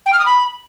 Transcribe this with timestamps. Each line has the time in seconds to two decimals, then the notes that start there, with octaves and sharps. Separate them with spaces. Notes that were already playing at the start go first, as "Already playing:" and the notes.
0.06 G5
0.13 F6
0.19 D#6
0.26 B5